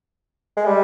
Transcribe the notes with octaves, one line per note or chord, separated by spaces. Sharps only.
G#3
G3